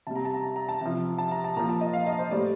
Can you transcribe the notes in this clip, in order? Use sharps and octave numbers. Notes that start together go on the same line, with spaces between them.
C3 G3 A5
A#5
A5
A#5
A5
A#5
A5
C3 F3
A5
A#5
A5
A#2 F3 A#5
A5
D#5
F5
D#5
C5
A2 G3 D5